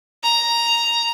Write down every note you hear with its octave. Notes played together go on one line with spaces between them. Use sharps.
A#5